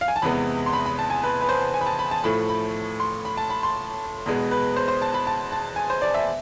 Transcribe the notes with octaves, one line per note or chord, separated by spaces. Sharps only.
F5
G#5
A5
E2 C3 G#3 B3 B5
C6
B5
B5
A5
G#5
B4
B4
C5
G#5
B5
A5
B5
A5
A2 F3 A3 B5
B5
C6
B5
A5
B5
C6
E2 B2 G#3 B3
B4
C5
C5
A5
B5
A5
A5
G#5
C5
D5
E5